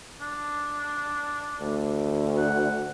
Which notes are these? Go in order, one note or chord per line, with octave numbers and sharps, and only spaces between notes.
D4
D2
F#5